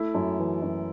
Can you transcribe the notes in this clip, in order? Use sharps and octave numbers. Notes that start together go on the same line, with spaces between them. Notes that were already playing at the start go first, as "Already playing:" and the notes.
Already playing: A3 E4
F#2
E3
F#2